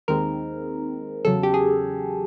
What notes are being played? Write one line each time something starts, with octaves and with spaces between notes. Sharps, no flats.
D#2 D#3 G#3 C4 A#4
E2 C#3 F#3 A4
G4
G#4